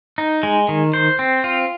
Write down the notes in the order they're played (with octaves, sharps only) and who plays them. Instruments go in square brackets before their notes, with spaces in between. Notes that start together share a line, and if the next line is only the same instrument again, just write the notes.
[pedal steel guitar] D#4
G#3
D#3
C5
C4
F4